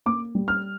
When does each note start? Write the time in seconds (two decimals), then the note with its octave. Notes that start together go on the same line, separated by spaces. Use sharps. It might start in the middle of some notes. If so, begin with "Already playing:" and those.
0.06 A#3 D6
0.35 G3
0.48 F6